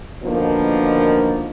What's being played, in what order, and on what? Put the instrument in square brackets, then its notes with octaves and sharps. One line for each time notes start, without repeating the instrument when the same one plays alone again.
[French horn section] B2 D3 D#3 F3 A#3